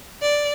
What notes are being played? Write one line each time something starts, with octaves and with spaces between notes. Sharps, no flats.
D5